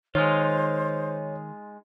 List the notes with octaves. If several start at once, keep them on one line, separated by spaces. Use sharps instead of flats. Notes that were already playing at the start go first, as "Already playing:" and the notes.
D#3 G#3 D#4 F4 C5 C#5